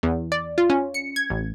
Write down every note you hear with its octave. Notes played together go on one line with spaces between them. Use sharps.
E2
D5
F4
C#4
C#7
G#6
A1